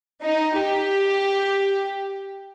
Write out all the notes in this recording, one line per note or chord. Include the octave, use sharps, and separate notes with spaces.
D#4
G4